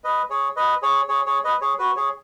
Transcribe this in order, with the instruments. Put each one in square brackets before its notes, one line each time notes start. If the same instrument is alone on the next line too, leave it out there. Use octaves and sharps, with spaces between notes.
[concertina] B4 D#5
G#4 C#5
B4 D#5
G#4 C#5
G#4 C#5
G#4 C#5
B4 D#5
G#4 C#5
F#4 B4
G#4 C#5